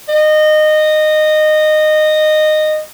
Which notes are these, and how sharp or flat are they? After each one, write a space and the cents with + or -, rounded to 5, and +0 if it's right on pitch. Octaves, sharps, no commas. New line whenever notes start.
D#5 -20